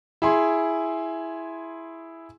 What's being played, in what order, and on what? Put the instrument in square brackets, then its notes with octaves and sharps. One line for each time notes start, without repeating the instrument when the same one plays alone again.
[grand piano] E4 G#4 C6